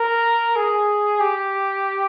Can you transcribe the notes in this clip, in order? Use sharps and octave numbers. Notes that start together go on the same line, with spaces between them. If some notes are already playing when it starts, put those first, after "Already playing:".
Already playing: A#4
G#4
G4